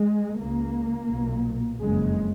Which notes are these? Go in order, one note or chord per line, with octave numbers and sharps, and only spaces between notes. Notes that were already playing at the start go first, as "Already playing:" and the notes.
Already playing: G#3
C#2 C#3 A#3
B1 A#2
F#1 F2 C#3 G#3